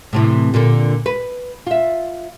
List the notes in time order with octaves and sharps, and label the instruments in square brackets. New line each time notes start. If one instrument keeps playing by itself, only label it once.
[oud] A2 C3 E3
A#2 D3
B4
F4 E5